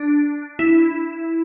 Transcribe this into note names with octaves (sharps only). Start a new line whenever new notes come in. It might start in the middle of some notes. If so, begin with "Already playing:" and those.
Already playing: D4
E4